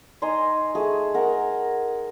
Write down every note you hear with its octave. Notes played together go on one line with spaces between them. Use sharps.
D#4 G#5 A#5 C6
A3 G#4
A#4 F#5